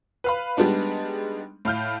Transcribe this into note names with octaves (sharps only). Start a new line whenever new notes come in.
B4 F5 B5
G3 G#3 B3 D4 D#4
A2 F5 F6 G6